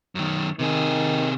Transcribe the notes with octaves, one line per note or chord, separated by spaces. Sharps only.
F#2 D#3
C3 D#3 G#4